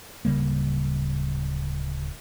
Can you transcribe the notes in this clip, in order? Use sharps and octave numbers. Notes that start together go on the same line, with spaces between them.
D1 C#3 G3 A#3